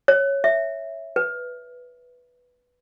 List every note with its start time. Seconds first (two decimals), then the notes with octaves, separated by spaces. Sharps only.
0.08 C#5
0.44 E5
1.16 B4